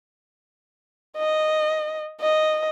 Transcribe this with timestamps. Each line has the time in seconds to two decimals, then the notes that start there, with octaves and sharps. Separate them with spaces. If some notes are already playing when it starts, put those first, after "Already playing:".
1.17 D#5
2.21 D#5